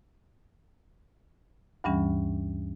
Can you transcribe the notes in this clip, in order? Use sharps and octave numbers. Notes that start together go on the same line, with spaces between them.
D2 G2 E3 G3 C#4